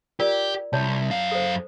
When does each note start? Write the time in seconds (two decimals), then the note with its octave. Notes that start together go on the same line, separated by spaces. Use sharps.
0.20 F4 G4 A#4 D5
0.73 C2 C#5 A5
1.11 F#2 F5
1.32 A4 C5